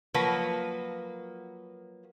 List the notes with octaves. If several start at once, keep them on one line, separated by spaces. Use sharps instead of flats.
F3 F#3 A#3 F#4 B4